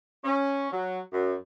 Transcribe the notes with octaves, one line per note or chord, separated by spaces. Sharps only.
C#4
F#3
F#2